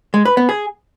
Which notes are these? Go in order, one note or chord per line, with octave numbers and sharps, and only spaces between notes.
G#3
B4
B3
G#4